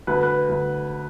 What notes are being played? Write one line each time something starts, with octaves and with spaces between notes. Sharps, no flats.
D2 B4
B4
D2